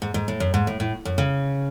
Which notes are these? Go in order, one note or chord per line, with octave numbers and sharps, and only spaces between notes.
G#2
G#2
A2
F#2
G#2
A2
A2
F#2
C#3